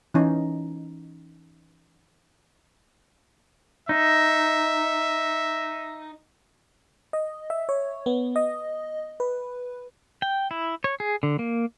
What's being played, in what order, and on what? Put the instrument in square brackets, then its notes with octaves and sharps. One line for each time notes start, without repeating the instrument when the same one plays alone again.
[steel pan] E3 C#4 D#4
[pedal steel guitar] D#4 [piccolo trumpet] E5
[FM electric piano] D#5
E5
C#5
B3
D#5
B4
[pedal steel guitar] G5
E4
C#5
G#4
D3
A#3